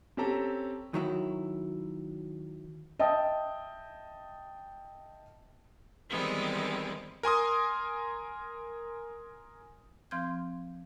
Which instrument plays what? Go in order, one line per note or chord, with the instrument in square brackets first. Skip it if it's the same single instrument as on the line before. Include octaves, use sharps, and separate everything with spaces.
[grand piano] C4 C#4 G4 A4 A#5
[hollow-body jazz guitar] D#3 F#3 E4
[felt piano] D#5 E5 G5 A5 D#6
[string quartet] D#3 E3 G3 G#3 B3 C4
[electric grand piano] A#4 G#5 C6 D#6
[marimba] F3 C4 C6 F6 G6 G#6